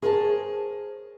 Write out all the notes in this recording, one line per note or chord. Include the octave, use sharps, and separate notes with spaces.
G#4 A#4 C5 C#5 E5 A5